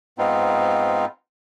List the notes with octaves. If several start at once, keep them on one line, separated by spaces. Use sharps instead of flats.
G#2 B3 C4 D#4 F4